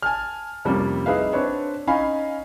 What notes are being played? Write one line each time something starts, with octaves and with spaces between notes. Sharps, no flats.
G#5 A5 F6
F2 C3 F3 G3 A#3 C#4
D#4 G#4 B4 E5 F5
C4 D4 B4 C#5
C#4 D#4 F5 G#5 B5